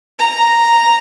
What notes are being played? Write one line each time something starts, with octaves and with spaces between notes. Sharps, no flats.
A#5